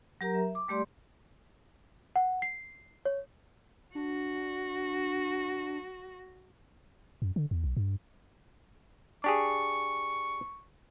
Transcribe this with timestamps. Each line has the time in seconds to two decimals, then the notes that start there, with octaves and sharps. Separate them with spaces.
0.21 F#3 G4 A#4 A#5
0.34 E5
0.55 D6
0.68 G3 A3 G4 D5 C6
2.16 F#5
2.42 C7
3.05 C#5
3.95 D4 F#4
7.22 F#2
7.36 D3
7.51 E2
7.64 B1
7.77 G2
9.24 D4 G4 G#4 C#6